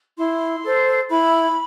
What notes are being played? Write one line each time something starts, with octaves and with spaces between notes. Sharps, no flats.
E4 C6
A4 C5
E4 B5